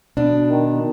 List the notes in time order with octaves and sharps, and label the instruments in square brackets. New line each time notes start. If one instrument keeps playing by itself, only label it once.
[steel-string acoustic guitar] B2 D4
[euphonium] D#3